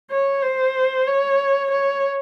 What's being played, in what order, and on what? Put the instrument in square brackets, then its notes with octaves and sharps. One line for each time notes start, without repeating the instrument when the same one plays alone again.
[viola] C#5
C5
C#5
C#5